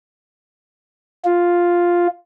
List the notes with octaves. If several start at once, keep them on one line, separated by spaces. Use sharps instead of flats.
F4